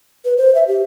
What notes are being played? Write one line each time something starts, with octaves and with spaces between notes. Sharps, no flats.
B4
C5
E5
G4